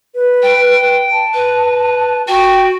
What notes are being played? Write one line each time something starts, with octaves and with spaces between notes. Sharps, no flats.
B4
G5
A5
B4
F#4 G5